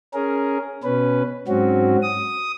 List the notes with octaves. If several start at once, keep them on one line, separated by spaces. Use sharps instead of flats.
C#4 G#4 A#4
B2 C#4 B4
G#2 F#3 C4 C#4 F#4
D#6